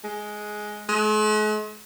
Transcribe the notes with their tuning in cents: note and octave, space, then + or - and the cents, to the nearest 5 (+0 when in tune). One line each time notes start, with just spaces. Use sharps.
G#3 +10
G#3 +45